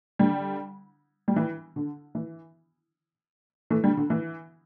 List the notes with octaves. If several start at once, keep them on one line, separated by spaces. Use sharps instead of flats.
D3 G3
G3
E3
D3
E3
E3 A3
D3 G3
D3
E3